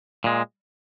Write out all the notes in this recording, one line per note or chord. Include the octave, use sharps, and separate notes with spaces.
A#2 G#3